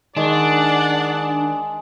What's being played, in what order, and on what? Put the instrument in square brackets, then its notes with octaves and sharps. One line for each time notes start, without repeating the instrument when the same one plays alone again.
[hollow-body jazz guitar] D#3 [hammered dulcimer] G#3 [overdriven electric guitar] D4 [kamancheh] D5 F#5